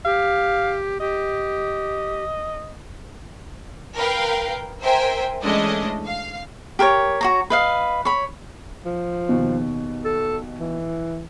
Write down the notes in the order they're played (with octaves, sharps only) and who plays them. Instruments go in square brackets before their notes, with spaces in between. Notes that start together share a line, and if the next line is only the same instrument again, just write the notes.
[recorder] G4 [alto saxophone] F5
[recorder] G4 [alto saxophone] D#5
[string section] A#4 B4 F5 G5
A#4 C5 E5 G5 G#5
E3 G#3 A3 C#4 D4 D#5
F5
[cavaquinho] G4 A#4 C5 C#5
F#4 C#5 A#5
B4 D#5 F5
C#5 B5
[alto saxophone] F3
[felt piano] D#2 B2
[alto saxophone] A4
E3